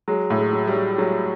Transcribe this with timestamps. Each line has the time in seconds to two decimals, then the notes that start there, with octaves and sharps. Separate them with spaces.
0.08 F#3 G#3
0.30 A2
0.37 G#3
0.53 F#3
0.67 G3
0.76 F#3
0.98 F#3 G#3